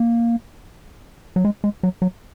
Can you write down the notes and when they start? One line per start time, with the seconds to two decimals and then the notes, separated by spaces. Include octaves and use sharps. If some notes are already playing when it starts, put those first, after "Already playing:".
Already playing: A#3
1.36 F#3
1.45 G#3
1.64 G#3
1.83 F#3
2.02 F#3